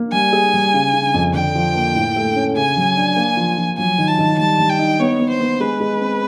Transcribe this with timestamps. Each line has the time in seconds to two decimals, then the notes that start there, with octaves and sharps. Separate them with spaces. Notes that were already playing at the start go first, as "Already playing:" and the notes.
Already playing: A#3
0.13 G3 G#5
0.33 G#4
0.54 G3
0.74 C#3
0.94 C#3
1.14 F2
1.34 D3 G5
1.55 F3
1.75 A#3
1.95 A2
2.16 A3
2.36 C#4
2.56 C#3 G#5
2.77 F#3
2.97 D4
3.16 A#3
3.37 F3
3.58 F3
3.78 F#3 G#5
3.98 D#3
4.08 A5
4.19 D#3
4.38 G3 A5
4.59 G3
4.69 G5
4.79 D#4
5.00 B3 C#5
5.19 B3
5.30 C5
5.40 B3
5.60 G#3 B4
5.81 G#3
6.01 C4